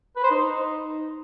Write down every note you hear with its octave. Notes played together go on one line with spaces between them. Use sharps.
B4
C5
D#4